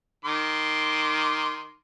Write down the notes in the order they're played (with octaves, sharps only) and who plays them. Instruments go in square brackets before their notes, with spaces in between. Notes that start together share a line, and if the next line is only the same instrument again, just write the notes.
[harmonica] D#3 C6 D6